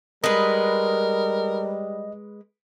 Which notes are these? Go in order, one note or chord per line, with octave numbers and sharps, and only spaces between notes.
G3 G#3 A#4 B4 D#5